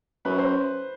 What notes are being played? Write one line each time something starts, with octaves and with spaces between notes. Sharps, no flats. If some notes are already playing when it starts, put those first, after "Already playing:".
F#2 B4
C5